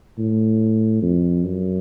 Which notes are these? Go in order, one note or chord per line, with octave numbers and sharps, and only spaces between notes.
A2
F2
F#2